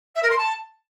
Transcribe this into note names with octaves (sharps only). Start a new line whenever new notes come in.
E5
A#4
C6
A5